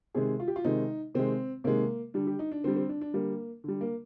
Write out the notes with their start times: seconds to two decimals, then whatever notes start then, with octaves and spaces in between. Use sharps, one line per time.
0.15 C3 D#3 G#3 G#4
0.40 F4
0.48 G4
0.56 F4
0.65 C3 D#3 G#3 D#4
1.15 C3 D#3 G#3 C4
1.64 C3 D#3 G#3 A#3
2.14 D3 G3 D4
2.27 G4
2.39 D#4
2.51 D4
2.64 D3 G3 C4
2.76 C4
2.89 D4
3.01 D4
3.14 D3 G3 A#3
3.64 D3 G3
3.81 A#3